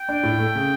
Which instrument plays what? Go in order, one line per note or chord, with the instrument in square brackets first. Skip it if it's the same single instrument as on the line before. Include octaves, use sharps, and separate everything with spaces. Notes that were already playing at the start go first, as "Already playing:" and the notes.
Already playing: [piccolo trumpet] G5
[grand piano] D4
A2
A3
C#3